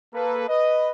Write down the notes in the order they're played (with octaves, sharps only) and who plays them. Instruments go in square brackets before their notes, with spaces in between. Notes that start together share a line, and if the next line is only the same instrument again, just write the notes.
[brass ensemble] A#3 A4 B4
B4 D#5